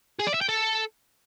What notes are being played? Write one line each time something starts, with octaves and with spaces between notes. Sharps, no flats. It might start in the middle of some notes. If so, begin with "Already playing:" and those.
G#4
D5
E5
G5
A4